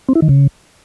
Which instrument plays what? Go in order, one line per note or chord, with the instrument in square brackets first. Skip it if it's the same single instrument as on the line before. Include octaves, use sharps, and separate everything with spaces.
[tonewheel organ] C4
E4
D#3
C#3